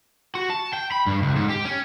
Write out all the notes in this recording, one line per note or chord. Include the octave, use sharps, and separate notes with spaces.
F#4
A5
G5
B5
G2
C#2
G#2
G4
C#4